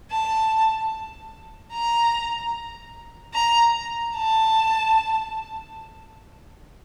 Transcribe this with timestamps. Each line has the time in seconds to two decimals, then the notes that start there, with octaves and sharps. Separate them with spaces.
0.11 A5
1.72 A#5
3.34 A#5
4.15 A5